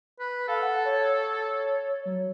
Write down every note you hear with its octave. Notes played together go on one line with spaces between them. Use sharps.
B4
A4 F5
F#5
C#5
F#3